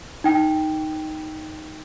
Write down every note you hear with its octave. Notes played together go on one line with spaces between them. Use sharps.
D#4 G5